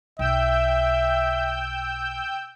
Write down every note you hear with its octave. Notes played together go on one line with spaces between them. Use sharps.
B1 E5 G5 E6 G6